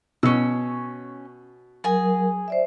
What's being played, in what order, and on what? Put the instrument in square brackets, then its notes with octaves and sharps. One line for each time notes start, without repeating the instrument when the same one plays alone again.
[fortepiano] B2 [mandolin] C#4 E6
[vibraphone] F#3 A#4 [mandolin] G#4 G#5
[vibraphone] C5 D5 E5